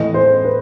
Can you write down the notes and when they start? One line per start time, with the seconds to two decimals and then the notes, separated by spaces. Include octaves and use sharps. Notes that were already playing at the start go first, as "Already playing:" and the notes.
Already playing: A2 E3 A3 D#5
0.14 C5
0.45 B4